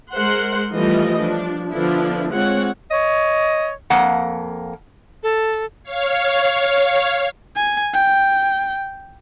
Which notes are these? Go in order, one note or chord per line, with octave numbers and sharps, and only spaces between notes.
G#3 A#4 C5 F#5 C6
E3 F3 G3 A3 F4 D#5
F3 D4
D3 F3 B3 D4 E4
G#3 C4 F4 C#5 F#5
C#5 D#5
F2 A#3 F#5
A4
C#5 F5
G#5
G5